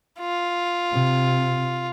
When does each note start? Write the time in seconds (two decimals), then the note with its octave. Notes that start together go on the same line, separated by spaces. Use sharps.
0.20 F4
0.93 C3